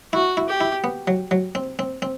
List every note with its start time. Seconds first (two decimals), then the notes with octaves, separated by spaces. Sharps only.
0.13 E4 F#4
0.37 E4
0.49 G4
0.61 E4
0.84 B3
1.07 F#3
1.31 F#3
1.55 C4
1.79 C4
2.02 C4